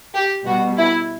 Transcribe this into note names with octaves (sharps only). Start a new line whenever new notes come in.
G4
B2 G3 F#4
E4